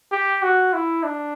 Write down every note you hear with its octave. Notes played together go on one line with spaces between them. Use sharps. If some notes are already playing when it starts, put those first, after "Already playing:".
G4
F#4
E4
D4